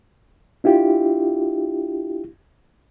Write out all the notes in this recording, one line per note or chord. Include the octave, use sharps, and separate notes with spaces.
D4 E4 F4 G4